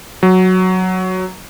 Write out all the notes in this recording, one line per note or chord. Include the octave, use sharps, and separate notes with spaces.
F#3